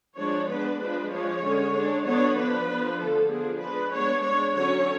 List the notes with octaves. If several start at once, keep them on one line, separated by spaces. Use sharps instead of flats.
F3 G#3 D4 C#5
G#3 B3 D4 B4
F3 G#3 D4 B4
F3 G#3 D4 C#5
D3 G#3 C#4
G#3 D4
D3 F#3 B3 D4 C#5
F3 B3 D4 B4
F3 B3 D4
D3 F3 A3 A4
F3 B3 D4 G#4
G#3 D4 B4
G#3 B3 D4 C#5
G#3 D4 C#5
D3 F#3 C#4 C#5